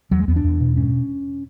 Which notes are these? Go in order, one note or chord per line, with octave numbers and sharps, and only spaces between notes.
E2 F#3
G#3
E2 B3
D4
E2
B2
G#2 C#4